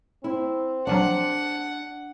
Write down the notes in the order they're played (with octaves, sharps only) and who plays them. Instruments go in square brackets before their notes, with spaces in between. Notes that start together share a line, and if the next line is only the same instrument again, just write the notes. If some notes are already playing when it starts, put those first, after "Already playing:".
[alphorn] C4 [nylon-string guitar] E4
[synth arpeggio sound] A#1 F3 F#3 [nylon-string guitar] D4 [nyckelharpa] F#5